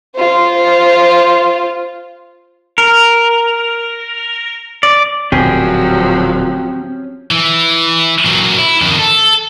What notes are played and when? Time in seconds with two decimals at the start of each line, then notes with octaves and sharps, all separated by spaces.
0.16 F4 C5
2.78 A#4
4.83 D5
5.32 D1 A#2 F3 F#3 C4 C#4 G4 G#4
7.31 E3
8.25 A#2 F#3
8.58 E4
8.82 F2 D#3
8.99 A4